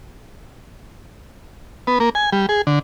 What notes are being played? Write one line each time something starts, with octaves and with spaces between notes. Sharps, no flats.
B3
A#3
G#5
G3
G#4
D3